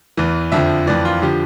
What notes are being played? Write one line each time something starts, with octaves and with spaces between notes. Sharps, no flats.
E2 E3
F2 D3 F3 E5
F2 E3 D5
F4
D3 F3 G4